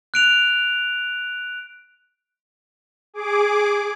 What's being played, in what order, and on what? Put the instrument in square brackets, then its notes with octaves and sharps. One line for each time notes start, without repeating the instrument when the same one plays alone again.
[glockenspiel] F#6 D7 F7
[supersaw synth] G#4 D6